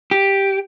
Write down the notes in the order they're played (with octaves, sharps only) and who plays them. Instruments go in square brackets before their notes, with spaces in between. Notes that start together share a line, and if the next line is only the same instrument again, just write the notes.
[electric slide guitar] G4